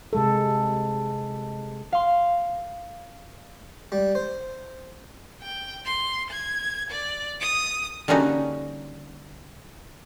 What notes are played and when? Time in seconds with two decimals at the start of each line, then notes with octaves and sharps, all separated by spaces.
0.13 C3 G#3 A4
1.92 F5 C6
3.92 G3
4.15 C5
5.42 G5
5.85 C6
6.30 G#6
6.91 D5
7.40 D#6
8.08 D3 G3 A#3 C#4 D#4 F#4